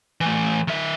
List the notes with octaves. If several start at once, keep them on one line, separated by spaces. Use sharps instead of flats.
E3 A3
D#3 E5